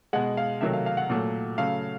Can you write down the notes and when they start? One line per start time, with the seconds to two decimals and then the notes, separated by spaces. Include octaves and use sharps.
0.13 B2 G#3 F#5
0.37 F5
0.61 C3 D#3 F#3 A3 E5
0.73 F5
0.86 F5
0.97 F#5
1.10 A#2 F#3 A3
1.58 C#3 F#3 A3 F5